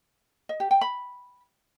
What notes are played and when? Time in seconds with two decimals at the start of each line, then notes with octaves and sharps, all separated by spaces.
0.49 D#5
0.60 G4
0.71 G5
0.81 B5